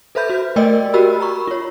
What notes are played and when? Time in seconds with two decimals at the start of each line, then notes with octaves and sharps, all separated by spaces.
0.15 A4 B4 C5 E5 B5 G6
0.30 F#4
0.56 A3 A#4 D5 D#5 G5 E6
0.94 F#4 G4 A#4 B5 E6
1.20 A#5 B5 C#6
1.47 F4 C#5